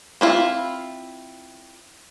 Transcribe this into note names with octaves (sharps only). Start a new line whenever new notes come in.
C4 E4 F4